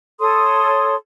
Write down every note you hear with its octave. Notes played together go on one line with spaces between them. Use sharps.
A4 C#5 C6 D#6